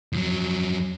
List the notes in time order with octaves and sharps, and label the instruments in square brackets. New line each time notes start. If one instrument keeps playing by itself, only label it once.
[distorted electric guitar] F2 F#3